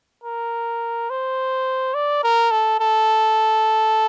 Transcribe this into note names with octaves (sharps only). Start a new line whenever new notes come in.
A#4
C5
D5
A#4
A4
A4